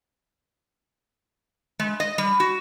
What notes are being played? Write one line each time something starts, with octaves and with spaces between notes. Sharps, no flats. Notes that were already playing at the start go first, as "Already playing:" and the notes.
G#3
D#5
G3
F#4